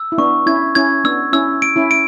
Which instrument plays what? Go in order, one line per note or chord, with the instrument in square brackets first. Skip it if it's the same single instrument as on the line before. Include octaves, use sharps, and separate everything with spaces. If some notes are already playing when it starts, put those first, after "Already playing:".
Already playing: [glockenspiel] E6
[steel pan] E4
[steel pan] B3 D4 [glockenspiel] C#6
[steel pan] C#4 E4 [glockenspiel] G#6
[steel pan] C#4 E4 [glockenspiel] G#6
[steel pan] B3 D4 [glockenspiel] E6
[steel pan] C#4 E4 [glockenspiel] E6
[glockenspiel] D7
[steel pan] C#4 E4
[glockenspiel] D7